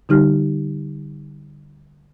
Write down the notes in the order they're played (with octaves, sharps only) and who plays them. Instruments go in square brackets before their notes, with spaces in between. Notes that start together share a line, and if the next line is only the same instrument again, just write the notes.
[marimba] D3 G3 D#4 G4 F6